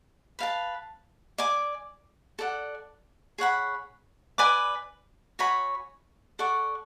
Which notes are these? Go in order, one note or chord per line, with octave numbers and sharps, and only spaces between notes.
B4 F5 A5
D5 G#5 D6
A4 D5 F#5
G#4 C#5 F#5 B5
B4 D5 G#5 D6
F#4 C#5 G#5 B5
A4 D5 F#5 C#6